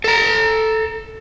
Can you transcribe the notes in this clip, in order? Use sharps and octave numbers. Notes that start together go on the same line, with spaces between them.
A4 A#5